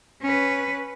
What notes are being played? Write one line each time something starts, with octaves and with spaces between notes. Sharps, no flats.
C#4 B4